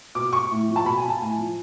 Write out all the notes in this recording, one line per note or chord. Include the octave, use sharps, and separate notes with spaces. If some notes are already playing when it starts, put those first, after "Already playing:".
B2 D6
C#6
A2
F3
A5
B2 B5
G#5
A5
A2 G#5
F3